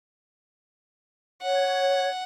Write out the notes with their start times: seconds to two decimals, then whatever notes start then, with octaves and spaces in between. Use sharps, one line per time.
1.43 C#5 F#5